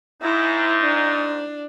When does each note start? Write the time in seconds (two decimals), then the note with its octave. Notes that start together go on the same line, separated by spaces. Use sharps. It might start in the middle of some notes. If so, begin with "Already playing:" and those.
0.22 G#2 D#4 E4
0.83 D4